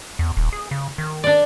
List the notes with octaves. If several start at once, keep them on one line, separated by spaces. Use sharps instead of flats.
E2
D#1
G#4
C#3
D#3
D4 D5